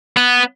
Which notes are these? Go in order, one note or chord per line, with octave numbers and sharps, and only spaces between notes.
B3